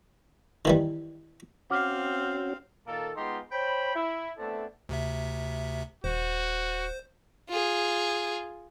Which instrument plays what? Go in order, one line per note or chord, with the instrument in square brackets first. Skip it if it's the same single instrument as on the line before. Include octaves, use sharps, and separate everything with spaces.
[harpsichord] D#3 E3 G3
[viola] C4 F5 [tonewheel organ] C#4 F#4 [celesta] F#5 D6 F6
[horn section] A#2 D#3 A#3 A4
G#3 B3 D#4 F4 G4 C6
C5 C#5 G5 B5
E4
A3 B3 C4 D4 E4 A4
[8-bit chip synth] D2 C3 E5
[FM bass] D#1 [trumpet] F#4 [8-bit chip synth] C5
[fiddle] F4 G#4